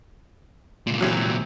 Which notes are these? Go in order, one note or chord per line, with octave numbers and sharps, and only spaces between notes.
C#2 A#2
C3 E3 F#3